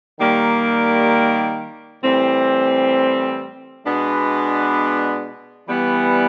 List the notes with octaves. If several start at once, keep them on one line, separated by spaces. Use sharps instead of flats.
D#3 G3 A#3
A2 E3 G3 C4
B2 G#3 B3 D4
E3 G3 B3